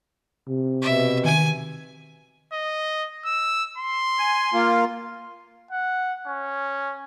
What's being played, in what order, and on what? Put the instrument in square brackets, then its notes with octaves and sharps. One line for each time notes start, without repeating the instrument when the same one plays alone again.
[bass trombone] C3
[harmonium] B2 [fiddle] E5
[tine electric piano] D#3 [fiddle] G#5
[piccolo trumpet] D#5
E6
C6
[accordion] G#5
A#3 F4
[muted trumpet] F#5
C#4